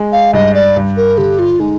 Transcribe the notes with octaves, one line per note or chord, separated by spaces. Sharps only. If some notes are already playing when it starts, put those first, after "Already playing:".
Already playing: G#3
F5
G2 D#5
D5
G2
A#4
D3 G4
F4
G#3 D#4